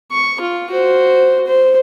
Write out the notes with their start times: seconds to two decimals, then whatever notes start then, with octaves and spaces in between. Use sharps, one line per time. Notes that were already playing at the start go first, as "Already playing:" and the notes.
0.12 C#6
0.41 F4
0.71 F#4 C5
1.46 C5